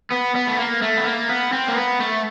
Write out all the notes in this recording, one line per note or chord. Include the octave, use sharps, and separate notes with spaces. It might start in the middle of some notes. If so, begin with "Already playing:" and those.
B3
B3
A3
A#3
A3
B3
A#3
B3
C4
A#3
B3
A3